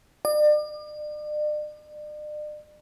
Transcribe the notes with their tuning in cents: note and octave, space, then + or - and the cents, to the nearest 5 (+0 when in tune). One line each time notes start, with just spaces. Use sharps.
D5 +40